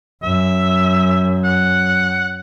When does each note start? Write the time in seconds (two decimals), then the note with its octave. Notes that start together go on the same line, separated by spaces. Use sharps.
0.23 F#2 E5
1.44 F#5